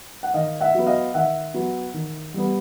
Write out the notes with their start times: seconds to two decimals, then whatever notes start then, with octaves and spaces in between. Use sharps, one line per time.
0.23 F#5
0.34 D#3 D#5 F5
0.60 E5 F#5
0.75 F#3 B3
0.87 D#5 F5
1.14 D#3 E5 F#5
1.54 F#3 B3
1.94 D#3
2.34 G3 B3